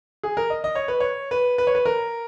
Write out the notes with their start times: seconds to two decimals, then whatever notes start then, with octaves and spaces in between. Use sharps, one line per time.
0.23 G#4
0.37 A#4
0.50 D#5
0.64 D#5
0.75 C#5
0.88 B4
1.00 C#5
1.31 B4
1.58 B4
1.67 C#5
1.75 B4
1.86 A#4